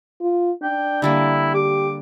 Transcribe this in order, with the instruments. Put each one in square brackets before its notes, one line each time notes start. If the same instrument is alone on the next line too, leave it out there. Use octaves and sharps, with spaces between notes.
[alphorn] F4
[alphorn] D4 [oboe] G5
[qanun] D3 G3 A#3 [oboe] E4
[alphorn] G4 [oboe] D6